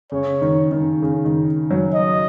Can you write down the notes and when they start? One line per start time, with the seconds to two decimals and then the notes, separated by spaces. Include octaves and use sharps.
0.12 C#3 C#5
0.42 D#3
0.72 D#3
1.02 C#3
1.25 D#3
1.71 F#3
1.94 D#5